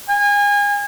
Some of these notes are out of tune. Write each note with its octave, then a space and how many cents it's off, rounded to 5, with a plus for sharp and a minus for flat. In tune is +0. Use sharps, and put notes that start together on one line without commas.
G#5 -30